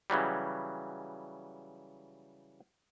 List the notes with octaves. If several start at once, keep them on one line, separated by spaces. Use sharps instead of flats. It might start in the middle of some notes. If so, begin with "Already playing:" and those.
C#3 E3 F#3 G3